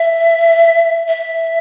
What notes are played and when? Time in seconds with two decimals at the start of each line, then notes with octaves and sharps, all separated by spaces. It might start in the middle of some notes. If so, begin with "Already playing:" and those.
Already playing: E5
1.08 E5